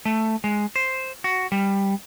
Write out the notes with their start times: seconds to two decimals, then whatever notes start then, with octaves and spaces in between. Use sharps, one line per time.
0.05 A3
0.44 G#3
0.76 C5
1.24 F#4
1.52 G3